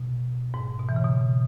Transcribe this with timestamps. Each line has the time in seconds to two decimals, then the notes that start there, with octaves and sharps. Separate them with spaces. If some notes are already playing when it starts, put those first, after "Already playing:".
Already playing: B2
0.54 G#2
0.80 B2
0.89 E3
0.96 C#3
1.05 B2